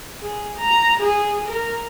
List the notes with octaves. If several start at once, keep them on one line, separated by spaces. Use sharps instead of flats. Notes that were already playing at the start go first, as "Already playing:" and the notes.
G#4
A#5
G#4
A#4